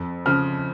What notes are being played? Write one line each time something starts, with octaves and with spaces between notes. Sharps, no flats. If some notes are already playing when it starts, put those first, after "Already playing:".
Already playing: F2
C#3 F3 F6